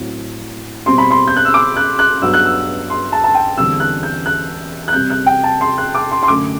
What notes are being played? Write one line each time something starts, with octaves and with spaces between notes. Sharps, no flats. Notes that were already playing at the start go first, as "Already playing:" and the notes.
Already playing: A2 F#3 C4
B2 G3 C4 C6
B5
C6
G6
F#6
E6
D6
F#6
F#6
G2 F#3 B3 E6
F#6
E6
C6
A5
A5
G5
E2 D3 G3 C4 E6
F#6
G6
F#6
F#6
C3 G3 C4 G6
F#6
G5
A5
C6
F#6
D6
C6
C6
F#2 D3 A3 D6